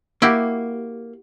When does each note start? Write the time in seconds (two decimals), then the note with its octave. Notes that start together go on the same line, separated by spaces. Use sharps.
0.22 A#3 E4 F#4 G4